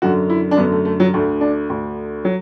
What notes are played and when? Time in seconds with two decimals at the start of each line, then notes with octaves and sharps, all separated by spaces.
0.02 F#2 D3 F#4
0.30 E4
0.51 D4
0.57 F#2 D3 B3
0.72 A3
0.85 A3
1.00 F#3
1.14 D2 D3 A3
1.41 D4
1.70 D2 D3
2.25 F#3